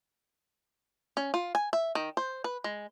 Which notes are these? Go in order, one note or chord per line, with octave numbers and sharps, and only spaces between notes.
C#4
F4
G#5
E5
D#3
C5
B4
G#3